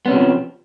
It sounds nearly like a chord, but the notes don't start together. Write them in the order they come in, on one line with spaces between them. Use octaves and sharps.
B3 C#4 C3 F#3 F3